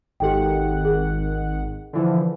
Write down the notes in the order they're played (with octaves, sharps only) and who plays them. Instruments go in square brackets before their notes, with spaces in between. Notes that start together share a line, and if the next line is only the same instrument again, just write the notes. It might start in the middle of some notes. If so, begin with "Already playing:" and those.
[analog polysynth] G#1 D#3 F#5 [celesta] G4 A4 G5
[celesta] G#4
[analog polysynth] D3 E3 F3